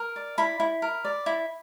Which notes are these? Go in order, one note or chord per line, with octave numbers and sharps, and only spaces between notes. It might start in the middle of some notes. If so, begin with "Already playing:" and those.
Already playing: A#4
D5
E4 B5
E4
A#4
D5
E4